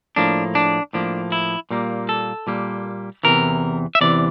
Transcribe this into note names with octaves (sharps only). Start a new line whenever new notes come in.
A2 F3 A#3 D4
D4
A2 F3 A#3 D4
E4
A#2 G3 A#3
A4
A#2 G3 A#3
E2 C3 E3 A#4
E5
E2 C3 E3 D5